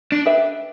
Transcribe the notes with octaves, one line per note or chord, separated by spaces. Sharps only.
D4
G4 B4 E5